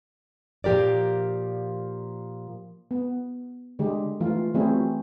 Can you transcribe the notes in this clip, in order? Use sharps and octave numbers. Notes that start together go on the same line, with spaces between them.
A#2 F3 G4 A#4 D5
B3
D3 G#3 G4
E3 F3 A3 F4
E3 F#3 A3 C4 E4 G#4